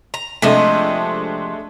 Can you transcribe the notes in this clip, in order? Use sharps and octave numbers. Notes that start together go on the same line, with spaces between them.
A#5
C3 F3 G#3 A3 D4 D#5